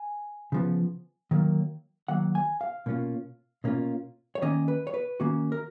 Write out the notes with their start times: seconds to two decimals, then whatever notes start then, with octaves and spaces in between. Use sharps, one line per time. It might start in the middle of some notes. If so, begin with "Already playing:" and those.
Already playing: G#5
0.52 C#3 F3 B3
1.31 D#3 F#3 A#3
2.08 D#3 F#3 A#3 F#5
2.35 G#5
2.61 F5
2.86 B2 A#3 C#4 F4
3.64 B2 A#3 C#4 F4
4.35 C#5
4.42 D#3 A#3 C#4 D#5
4.68 B4
4.87 C#5
4.94 B4
5.20 D#3 A#3 C#4 F#4
5.52 A#4